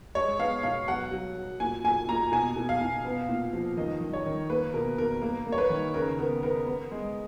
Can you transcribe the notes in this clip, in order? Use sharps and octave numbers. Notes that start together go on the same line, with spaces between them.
G#3 C#5
B3 F5
B2 F5
F#3 F#5
F#3
F#3
A#2 G#5
A#2 G#5
A#2 A#5
B2 G#5
B2
F5
B2
B3
A#2
F3
D#3 D#5
D#3
C#5
D#3
A#3 B4
B2 A#4
B2 A#4
A#3 A#4
A#3
C#5
B4
D#3
C#3 A#4
B3 A#4
B3 A#4
B3
G#3